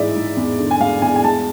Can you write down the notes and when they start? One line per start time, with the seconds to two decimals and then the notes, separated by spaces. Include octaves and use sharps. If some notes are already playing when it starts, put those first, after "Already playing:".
Already playing: G#2 E3 G#3 D5 E5
0.15 G#2
0.37 E2
0.59 D3
0.71 G#5
0.80 G#3 F5
1.02 E2 G#5
1.16 G#5
1.23 G#3 A5